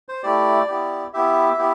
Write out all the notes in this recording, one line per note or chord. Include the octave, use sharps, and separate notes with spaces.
C5
A3 E4 G4 D5
B3 E4 G4
B3 E4 G4 E5
B3 E4 G4